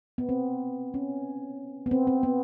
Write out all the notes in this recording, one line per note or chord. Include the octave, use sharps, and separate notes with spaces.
B3
C4
C#4
B3
C4
C4
B3